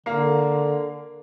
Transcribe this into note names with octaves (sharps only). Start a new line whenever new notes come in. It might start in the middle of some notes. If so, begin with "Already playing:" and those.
D3 A#3 F5